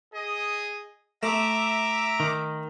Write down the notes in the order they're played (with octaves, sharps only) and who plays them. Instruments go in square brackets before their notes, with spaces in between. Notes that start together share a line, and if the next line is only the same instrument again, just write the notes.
[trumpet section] G#4 D#5
[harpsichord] A3 [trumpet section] E5 [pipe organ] A#5 D6
[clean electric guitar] D#3